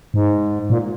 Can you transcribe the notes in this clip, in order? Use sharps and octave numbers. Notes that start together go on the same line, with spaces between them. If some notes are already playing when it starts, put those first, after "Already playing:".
G#2
A#2